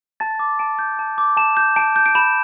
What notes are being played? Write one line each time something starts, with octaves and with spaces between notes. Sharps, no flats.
A5 A6
D6
A5 D7
G6
A5
D6
A5 E7
G6
A5 D7
G6
D7
B5 E7